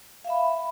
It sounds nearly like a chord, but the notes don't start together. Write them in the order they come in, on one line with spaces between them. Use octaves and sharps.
F5 E5 B5